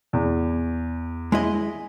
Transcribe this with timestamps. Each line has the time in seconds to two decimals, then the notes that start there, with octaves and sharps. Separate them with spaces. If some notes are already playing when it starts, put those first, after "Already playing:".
0.13 E2
1.32 G#3 E4 D#5